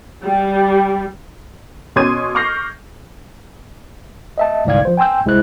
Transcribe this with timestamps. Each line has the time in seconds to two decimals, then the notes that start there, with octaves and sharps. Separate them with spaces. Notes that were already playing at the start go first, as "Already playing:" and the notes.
0.24 G3
1.96 B2 C#4 C6 D6 G#6 D#7
2.35 C#6 D6 F6 G6 A#6 C7
4.38 D#5 E5 A5
4.65 G1 C2 G#2 D5 F5 G#6
4.85 F3 C5
4.97 G5 G#5 C6 E6 G6
5.26 C2 G#3 E4 C5 F#6